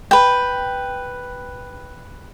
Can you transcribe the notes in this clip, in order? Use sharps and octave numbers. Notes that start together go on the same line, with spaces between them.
B4 G5